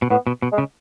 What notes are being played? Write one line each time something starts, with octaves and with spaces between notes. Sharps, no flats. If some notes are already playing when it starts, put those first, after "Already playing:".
B2
A2 B3
B2
B2
G#3
C#3